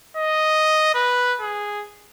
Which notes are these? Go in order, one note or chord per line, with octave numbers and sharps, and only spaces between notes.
D#5
B4
G#4